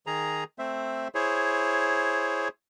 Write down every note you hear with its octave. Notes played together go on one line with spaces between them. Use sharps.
D#3 G#4 A#5
A3 C4 C5 E5
E4 G#4 C5 C#5